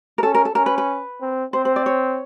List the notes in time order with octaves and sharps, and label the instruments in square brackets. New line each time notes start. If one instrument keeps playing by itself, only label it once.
[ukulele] A#4
[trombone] C#4 [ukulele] A4
[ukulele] A#4
A4
[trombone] C#4 [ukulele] A#4
[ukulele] B4
B4
[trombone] C4
[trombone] C4 [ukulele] C5
[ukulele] C5
D5
C#5